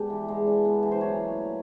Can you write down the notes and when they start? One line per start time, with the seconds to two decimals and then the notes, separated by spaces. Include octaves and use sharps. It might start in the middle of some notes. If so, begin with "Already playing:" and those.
Already playing: G#3 B3 D4 G4
0.10 E3
0.28 G#3
0.47 D4
0.65 B3
0.83 E3
0.92 C5
1.01 F#3 C#5
1.19 A#2
1.37 A3